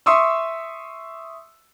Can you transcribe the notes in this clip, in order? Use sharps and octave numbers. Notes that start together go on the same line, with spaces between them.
E5 C6 C#6 D#6 E6